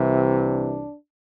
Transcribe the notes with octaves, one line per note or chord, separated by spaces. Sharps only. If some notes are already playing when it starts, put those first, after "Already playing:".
Already playing: C2 C3 E3
D4